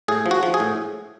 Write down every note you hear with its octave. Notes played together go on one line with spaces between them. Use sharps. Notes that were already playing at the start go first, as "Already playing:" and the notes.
A2 G#4
F3
F#4
F3
G#4
A2